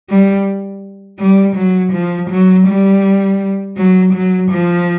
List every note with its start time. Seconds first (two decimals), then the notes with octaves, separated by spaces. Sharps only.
0.10 G3
1.19 G3
1.56 F#3
1.93 F3
2.31 F#3
2.67 G3
3.77 F#3
4.14 F#3
4.52 F3